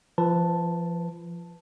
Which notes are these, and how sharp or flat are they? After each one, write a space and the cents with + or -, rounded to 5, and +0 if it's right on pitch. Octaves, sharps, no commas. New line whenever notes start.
F3 -30 B4 +0 A5 +0